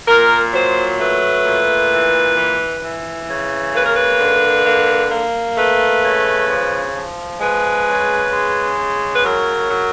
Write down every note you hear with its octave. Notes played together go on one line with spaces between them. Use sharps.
A#2 A#4
F#3 C5
A3 B4
A#2
E3
E3
E3
C#3
A#3 B4
A#4
B4
D3
A#3
A#3
A3 B4
C#3
F3
F3
G#3 B4
C#3
G#3
C#3
B4
F#3 A#4
F#3